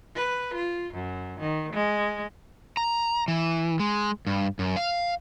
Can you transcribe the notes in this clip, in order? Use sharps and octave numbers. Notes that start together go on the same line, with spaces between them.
B4
F4
F#2
D#3
G#3
A#5
E3
G#3
G2
F#2
F5